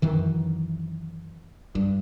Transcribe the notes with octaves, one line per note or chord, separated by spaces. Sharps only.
F#2 D#3 E3
G2